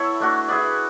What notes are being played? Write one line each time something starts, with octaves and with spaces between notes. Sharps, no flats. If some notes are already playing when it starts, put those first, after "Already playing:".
Already playing: B3 E4 A4 C#5 E5
A3 D4 F#4
E4 G#4 B4 D5